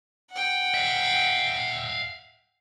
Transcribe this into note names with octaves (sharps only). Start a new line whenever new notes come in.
F#5 G5
E5 F5